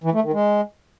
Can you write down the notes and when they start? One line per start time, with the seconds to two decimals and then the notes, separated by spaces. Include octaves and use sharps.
0.04 E3
0.14 A3
0.23 D#3
0.33 G#3